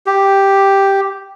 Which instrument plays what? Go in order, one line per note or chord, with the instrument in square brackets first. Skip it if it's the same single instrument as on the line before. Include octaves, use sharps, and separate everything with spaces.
[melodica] G4